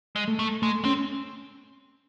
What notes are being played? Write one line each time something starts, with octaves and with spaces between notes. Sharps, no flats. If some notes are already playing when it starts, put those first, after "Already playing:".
G#3
A3
A3
G#3 A3
C4 C#4